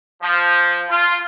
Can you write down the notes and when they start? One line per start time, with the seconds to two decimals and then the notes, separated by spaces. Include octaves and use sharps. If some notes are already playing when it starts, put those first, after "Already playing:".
0.22 F3
0.89 F4